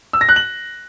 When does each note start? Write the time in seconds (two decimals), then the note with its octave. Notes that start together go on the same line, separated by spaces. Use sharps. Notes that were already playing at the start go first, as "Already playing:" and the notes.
0.13 E6
0.21 A#6
0.29 F#6
0.36 F#7